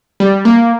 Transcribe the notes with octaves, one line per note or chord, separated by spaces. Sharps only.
G3
A#3